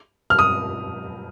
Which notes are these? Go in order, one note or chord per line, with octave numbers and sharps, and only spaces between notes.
F6
D#6